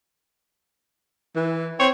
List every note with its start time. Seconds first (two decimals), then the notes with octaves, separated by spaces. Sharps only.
1.36 E3
1.80 C4 C#5